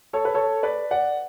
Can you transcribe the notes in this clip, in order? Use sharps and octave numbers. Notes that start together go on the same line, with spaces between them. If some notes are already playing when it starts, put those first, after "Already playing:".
A4 C#5
B4
A4 C#5
B4 D5
D5 F#5